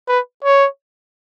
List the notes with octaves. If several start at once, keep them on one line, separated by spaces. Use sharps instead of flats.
B4
C#5